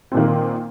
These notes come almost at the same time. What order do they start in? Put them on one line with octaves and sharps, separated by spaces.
C4 A#2 D#3 A#3